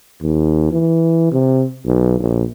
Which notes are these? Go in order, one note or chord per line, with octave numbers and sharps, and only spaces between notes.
D#2
E3
C3
B1
A#1